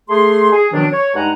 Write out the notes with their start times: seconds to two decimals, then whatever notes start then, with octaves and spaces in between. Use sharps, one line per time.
0.09 A3 G#4 C6
0.52 G#4
0.73 B2 D#3 F3 F#3 D4
0.92 C#5
1.15 G2 G#3 D#4 F#5 G#5 A#5